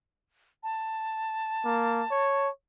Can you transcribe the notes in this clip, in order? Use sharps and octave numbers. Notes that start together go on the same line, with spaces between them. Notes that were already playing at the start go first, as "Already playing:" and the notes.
A5
A#3
C#5